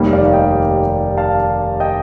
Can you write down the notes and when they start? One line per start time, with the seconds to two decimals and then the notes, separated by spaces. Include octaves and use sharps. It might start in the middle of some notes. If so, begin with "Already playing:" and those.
Already playing: F1 D#2 D#3 G3 A#3
0.13 D5 F5
0.26 F5
0.33 D#5 G5
1.17 F5 A5
1.80 D#5 G5